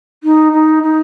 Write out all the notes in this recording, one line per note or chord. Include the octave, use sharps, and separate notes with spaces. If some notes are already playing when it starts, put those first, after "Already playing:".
D#4
D#4
D#4